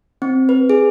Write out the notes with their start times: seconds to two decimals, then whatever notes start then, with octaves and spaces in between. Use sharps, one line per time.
0.22 C4
0.49 B4
0.70 G#4